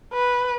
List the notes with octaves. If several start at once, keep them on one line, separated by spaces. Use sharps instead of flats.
B4